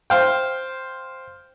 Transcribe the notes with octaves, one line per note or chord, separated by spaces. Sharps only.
C5 F5 G5